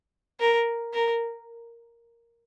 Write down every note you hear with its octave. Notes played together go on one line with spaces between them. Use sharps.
A#4
A#4